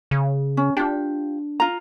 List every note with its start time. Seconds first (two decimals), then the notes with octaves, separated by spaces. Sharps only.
0.11 C#3
0.57 C#4
0.77 D4 F4 G4
1.60 F4 A#5